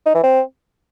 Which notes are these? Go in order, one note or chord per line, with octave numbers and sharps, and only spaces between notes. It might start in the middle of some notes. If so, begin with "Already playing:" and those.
D#4
E3
C4